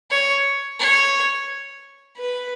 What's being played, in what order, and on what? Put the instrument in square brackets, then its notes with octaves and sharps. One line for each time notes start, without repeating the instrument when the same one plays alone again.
[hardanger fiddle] C#5
C#5
B4